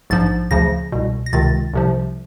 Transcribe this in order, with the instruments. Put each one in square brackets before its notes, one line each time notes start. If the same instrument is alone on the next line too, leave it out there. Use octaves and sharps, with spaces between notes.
[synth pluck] A#1 G#2 F3 A6
D2 C#3 F3 A#6
C2 B2
A#6
C#2 C3 D#3 A6
C2 C3 F3